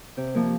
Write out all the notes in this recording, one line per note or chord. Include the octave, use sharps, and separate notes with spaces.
C3
F3 A#3